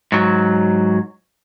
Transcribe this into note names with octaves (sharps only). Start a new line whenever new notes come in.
G#2 F#3